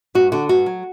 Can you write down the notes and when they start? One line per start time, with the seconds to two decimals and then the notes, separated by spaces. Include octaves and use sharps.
0.15 G2 F#4
0.32 D3 F#4
0.49 G2 F#4
0.66 F#3